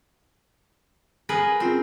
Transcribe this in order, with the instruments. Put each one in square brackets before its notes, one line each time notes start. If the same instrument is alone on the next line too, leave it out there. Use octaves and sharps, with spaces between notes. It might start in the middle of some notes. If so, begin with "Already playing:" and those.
[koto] G#4 A#4 B4
[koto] C4 [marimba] C#4 F4 G#4